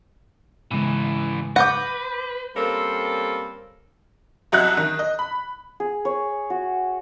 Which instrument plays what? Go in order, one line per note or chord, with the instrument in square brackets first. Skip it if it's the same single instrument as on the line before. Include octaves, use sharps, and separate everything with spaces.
[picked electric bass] G#1 C#3 G#3 [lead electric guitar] A2 E3
[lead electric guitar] B4 [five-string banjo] F#5 [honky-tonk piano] D6 G6 A#6
[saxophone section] G3 A#3 C4 C#4 A4
[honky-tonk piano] C2 F#3 F#4 D#5 E5 F#6
D#3
D#5
B5
[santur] G#4
C#5
F#4